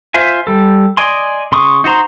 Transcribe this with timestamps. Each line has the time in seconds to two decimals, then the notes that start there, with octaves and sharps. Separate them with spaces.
0.14 F4 C5 E5 G#5
0.47 G3 A4
0.97 D5 D#5 G#5 C6
1.52 C#3 C6 C#6 D#6
1.84 D#4 F#4 C5 A#5 C6